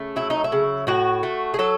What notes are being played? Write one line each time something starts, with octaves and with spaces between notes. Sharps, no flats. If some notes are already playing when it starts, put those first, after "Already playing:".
Already playing: C#3 A3
F#3 E4
D#4
E4
C#3
A2 F#4
A3
G#4
F#3 A4